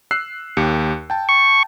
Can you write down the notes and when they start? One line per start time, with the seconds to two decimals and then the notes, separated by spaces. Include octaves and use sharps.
0.11 E6 F#6 C7
0.57 D#2 G4 C#7
1.10 G5 A5
1.29 C#6